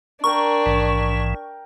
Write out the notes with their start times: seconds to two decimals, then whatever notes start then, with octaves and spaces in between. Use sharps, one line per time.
0.24 D4 A#4 G5 C#6
0.66 A#1 G#2 E3